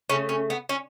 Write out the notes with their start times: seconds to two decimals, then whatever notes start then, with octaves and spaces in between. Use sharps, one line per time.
0.10 C#3 A3 C#4
0.29 C#4
0.50 B3
0.69 C#4